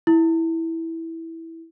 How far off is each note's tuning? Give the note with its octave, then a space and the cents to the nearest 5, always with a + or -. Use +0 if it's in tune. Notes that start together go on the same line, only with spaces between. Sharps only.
E4 -10